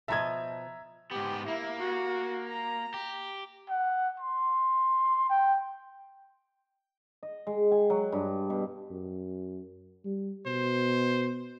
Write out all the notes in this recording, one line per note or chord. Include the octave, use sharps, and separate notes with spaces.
B2 F3 D#5 E5 A#5 G#6
G#2 B3 G4
A#3 E4
F#4
A#5
G4
F#5
C6
G5
D#5
G#3
G#5
F#3
G2
B2
F#2
G3
B2 C5